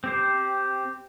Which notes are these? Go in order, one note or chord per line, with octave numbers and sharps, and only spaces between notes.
C4 G4 C5